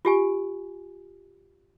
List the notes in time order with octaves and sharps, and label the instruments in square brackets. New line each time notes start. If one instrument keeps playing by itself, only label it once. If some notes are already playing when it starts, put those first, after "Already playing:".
[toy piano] F4 G4 G#5